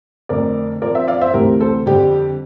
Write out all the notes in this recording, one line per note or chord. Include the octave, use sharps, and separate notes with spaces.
F2 D3 A3 C4 A#4 D5
A#2 F3 C4 A#4 D5
C5 E5
D5 F5
C5 E5
D2 C3 E3 A3 G4 A#4
A4 C5
F2 D3 G3 C4 G4